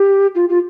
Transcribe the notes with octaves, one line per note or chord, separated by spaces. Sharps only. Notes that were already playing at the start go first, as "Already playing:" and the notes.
Already playing: G4
F4
F4